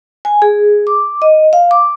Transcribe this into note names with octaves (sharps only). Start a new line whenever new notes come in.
G#5
G#4
D6
D#5
F5
D6